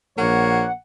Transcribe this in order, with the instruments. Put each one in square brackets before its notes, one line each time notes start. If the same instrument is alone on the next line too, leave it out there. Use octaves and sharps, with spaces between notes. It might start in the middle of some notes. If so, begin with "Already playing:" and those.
[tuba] A#1 [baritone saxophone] A#3 [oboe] C#5 [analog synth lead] F#5